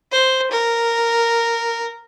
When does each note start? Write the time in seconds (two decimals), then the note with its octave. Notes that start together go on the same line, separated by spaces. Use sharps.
0.12 C5
0.51 A#4